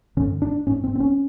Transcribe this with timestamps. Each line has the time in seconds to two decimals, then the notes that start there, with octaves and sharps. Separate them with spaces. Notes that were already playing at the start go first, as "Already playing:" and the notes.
0.17 G2 D3 C#4
0.42 D4
0.67 G#2 C#4
0.84 C4
0.96 C4
1.00 C#4